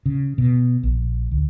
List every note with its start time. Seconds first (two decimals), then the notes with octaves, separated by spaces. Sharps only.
0.06 C#3
0.38 B2
0.83 A#1
1.31 D2